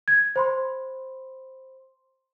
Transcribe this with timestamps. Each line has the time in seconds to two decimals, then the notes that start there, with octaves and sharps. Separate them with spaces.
0.08 G#6
0.36 C5 B5 C6